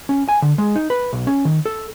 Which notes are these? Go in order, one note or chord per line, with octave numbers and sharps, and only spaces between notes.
C#4
G#5
D3
G#3
D#4
B4
B1
C#4
D#3
A4